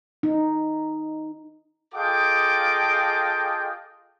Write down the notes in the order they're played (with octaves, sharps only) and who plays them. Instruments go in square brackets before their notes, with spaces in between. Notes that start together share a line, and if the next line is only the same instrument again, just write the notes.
[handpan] D#4
[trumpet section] F4 G#4 A4 D#5 G5 D6